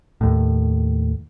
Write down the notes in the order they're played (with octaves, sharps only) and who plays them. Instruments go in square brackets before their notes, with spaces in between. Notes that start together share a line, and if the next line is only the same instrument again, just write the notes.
[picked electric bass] D#2 A2